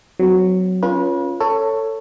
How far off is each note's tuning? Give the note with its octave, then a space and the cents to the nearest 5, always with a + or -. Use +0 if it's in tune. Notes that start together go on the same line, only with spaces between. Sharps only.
F#3 +0 C4 -35
C#4 +0 F4 -5 B4 -35
A4 +20 C#5 +0